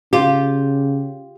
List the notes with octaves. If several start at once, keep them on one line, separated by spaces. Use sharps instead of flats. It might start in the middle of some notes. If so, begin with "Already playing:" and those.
C#3 F4 G4